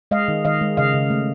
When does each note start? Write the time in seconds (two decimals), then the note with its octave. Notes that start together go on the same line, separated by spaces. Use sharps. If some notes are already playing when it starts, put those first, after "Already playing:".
0.11 G#3 D#5 F5
0.28 D#3
0.45 D#3 D#5 F5
0.61 G#3
0.77 C#3 D#5 F5
0.94 C#3
1.10 A3